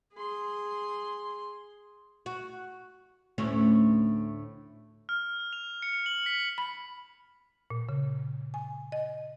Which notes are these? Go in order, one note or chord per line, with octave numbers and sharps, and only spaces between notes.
G#4 C6
F#4
D2 A2 C#4
F6
F7
C#7
F#7
B6
B5
A#2
C#3
G#5
D#5